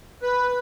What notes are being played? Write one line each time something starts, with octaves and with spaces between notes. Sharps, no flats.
B4